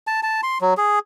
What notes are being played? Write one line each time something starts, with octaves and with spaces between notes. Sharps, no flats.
A5
A5
C6
F#3
G#4